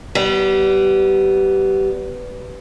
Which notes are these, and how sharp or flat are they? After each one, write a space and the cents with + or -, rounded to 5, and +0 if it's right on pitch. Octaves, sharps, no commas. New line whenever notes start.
G3 -20 B3 +5